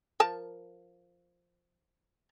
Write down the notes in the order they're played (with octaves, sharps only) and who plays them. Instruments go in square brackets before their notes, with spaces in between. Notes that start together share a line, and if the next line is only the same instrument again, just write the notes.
[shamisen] F3 A#4 A5